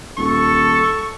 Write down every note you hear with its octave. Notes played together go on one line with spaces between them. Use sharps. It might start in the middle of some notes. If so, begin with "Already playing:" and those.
D#1 A4 C#6